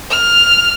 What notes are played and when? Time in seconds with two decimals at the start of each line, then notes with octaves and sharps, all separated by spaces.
0.10 F6